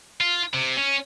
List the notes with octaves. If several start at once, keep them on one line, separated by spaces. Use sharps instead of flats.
F4
C3
C#4